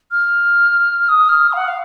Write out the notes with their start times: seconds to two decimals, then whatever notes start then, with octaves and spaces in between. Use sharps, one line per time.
0.11 F6
1.09 D#6
1.29 F6
1.48 D#6
1.53 F5
1.57 F#5
1.68 F5